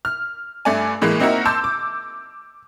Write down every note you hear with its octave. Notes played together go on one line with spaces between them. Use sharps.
F6
G2 A3 D5 G#5
A2 E3 G#3 A#3
A#3 C4 D#4 E4 F#4 A#4
A5 C6 D6 E6 G6
D6